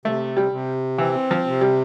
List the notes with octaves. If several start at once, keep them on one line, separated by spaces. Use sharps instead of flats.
C3 A3
G3
C3
E3 C4
F3
C3
G3